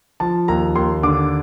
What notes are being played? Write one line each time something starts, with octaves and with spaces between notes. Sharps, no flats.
F3 A5
D#2 A#5
D#2 C6
D3 D6